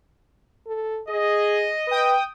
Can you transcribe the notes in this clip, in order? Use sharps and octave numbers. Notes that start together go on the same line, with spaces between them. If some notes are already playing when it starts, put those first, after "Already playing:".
A4
G#4 D#5
B4 G5 D#6